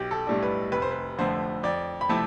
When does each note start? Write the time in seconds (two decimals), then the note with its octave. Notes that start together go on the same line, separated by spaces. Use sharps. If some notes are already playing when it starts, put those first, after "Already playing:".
Already playing: B1 G4
0.11 A4
0.27 A2 G3 D4
0.43 B4
0.72 F1 B4
0.82 C5
0.91 B4
1.18 F2 D3 F3 A3 C5
1.63 F2 D5
2.01 B5
2.09 C3 F3 A3 E4 A5